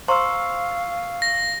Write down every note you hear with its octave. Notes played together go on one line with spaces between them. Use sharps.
C5 F5 A#5 C6 C#6 E6
A#6